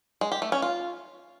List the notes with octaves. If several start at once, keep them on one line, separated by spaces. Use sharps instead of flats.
G#3
G4
A3
C#4
F4